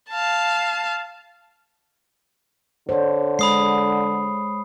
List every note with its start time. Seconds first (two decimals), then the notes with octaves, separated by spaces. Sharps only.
0.11 F5 A5
2.89 D3 C5 C#5
3.39 G#3 B5 D#6 C7